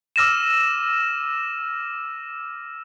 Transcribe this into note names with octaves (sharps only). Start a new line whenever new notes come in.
D6 E6 F6 A#6 D#7 E7